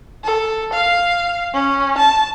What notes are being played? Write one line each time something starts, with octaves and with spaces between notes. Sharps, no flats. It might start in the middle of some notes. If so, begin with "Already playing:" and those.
A4
F5
C#4
A5